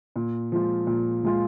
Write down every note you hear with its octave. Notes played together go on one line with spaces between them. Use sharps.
A#2
F3 G#3 F4
A#2
F3 G#3 F4